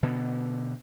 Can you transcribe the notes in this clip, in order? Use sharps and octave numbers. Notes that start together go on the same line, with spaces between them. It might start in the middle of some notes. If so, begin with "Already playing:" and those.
B2 D3 B3